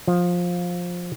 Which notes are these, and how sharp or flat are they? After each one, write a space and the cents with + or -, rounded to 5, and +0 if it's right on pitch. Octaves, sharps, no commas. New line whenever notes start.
F3 +15